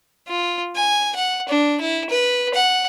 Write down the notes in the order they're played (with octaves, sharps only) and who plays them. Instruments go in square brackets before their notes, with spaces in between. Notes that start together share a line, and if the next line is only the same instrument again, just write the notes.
[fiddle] F4
G#5
F#5
D4
E4
B4
F#5